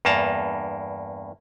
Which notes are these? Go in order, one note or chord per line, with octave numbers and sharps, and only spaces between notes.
E2 G2 A#3 A5 A#5